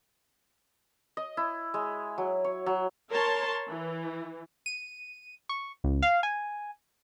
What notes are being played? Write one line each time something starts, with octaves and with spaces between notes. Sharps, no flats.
D#5
E4
G#3
F#3
C#5
F#3
A#4 C#5 A5 C6
E3
D#7
C#6
C#2
F5
G#5